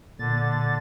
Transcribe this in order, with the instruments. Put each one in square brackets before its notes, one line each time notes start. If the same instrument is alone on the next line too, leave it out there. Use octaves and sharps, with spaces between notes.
[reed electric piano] A#2 [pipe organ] D3 A6